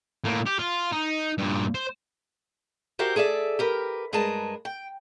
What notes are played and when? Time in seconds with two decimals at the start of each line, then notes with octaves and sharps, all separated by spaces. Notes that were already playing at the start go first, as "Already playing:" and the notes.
0.24 A2 A#3
0.46 G4
0.59 F4
0.92 D#4
1.38 G2 A#2
1.75 C5
2.99 F#4 G4 A#4 C5 E5
3.16 G#4 A4 D5 E5
3.59 G4 A#4 B4
4.13 G2 G#3 A#4 B4 A5
4.65 G5